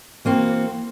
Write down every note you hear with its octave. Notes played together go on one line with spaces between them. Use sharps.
E3 A#3 C4 F#4